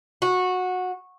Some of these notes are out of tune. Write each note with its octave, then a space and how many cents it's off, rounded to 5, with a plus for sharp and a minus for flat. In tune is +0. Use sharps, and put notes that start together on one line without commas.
F#4 -15